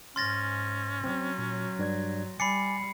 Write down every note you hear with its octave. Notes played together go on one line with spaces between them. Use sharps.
G#2 C#4 C6 F6 A6 A#6
F#3 C4
A#2
G2 D5 G#6
G3 G#5 B5 D6 A6 C7 C#7